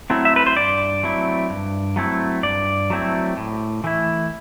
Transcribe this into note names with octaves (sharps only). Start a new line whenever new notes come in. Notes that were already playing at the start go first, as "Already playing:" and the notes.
F#3 A3 C4 E4
E5
B4
C5
G2 D5
F#3 A3 C4 E4
G2
F#3 A3 C4 E4
G2 D5
F#3 A3 C4 E4
A2
E3 A3 E4